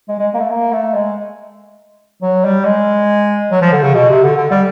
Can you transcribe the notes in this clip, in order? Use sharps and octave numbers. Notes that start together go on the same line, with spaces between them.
G#3
G#3
A#3
A3
A#3
A3
G#3
F#3
G3
G#3
F#3
F3
D3
C#3
B2
C3
D3
D3
G3